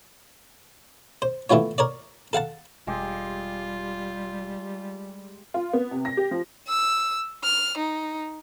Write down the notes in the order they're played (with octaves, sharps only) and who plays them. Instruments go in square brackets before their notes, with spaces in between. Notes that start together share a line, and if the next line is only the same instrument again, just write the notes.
[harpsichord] C5
E3 A3 B3 F4 C#5
A#4 C#5 D5
A4 F5 F#5 A5
[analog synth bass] E1 [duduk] G3 [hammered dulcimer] G#3 G4 [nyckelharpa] F4
[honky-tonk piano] F4
B3
C3
A#6
G4
F3
[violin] E6
F6
D#4